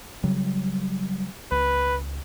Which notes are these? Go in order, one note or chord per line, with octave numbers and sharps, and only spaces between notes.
C#3 F#3 G3
C#2 B4